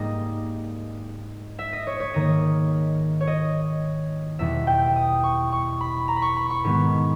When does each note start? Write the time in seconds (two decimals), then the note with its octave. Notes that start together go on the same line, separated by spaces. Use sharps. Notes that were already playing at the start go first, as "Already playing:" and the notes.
Already playing: G#2 G3 A#3 D#5
1.59 E5
1.73 D#5
1.87 C#5
2.00 C#5
2.14 G#2 D#3 A#3 D#5
3.20 C#5
3.27 D#5
4.39 E2 B2 G3 E5
4.67 G5
4.96 D#6
5.23 C#6
5.52 C#6
5.81 B5
6.08 A#5
6.16 B5
6.22 C#6
6.36 B5
6.50 C#6
6.64 G#2 D#3 G#3 B3